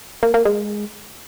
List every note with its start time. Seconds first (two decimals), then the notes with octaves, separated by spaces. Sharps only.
0.23 A#3
0.34 A#3
0.45 G#3